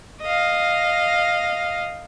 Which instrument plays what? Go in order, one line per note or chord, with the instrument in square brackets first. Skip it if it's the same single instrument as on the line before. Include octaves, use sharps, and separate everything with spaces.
[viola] D#5 F5